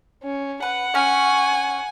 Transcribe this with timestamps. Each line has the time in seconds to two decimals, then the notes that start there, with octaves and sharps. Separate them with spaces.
0.23 C#4
0.62 B4 F#5
0.95 C#4 G#5